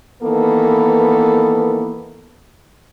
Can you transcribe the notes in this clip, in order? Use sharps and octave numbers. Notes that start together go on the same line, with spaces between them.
D#3 E3 A#3 B3 A4